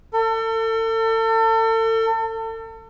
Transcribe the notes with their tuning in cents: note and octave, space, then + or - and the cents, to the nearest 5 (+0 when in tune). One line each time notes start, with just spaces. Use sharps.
A4 +35